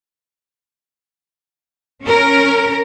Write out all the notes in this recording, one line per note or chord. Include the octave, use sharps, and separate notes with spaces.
C#4 A#4